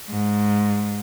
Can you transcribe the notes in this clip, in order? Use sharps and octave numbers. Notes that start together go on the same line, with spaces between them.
G#2